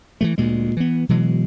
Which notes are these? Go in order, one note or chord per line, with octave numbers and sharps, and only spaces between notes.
E3 F3 A3
D2 A#2 G#3
E3 B3
B2 E3 F#3 G#3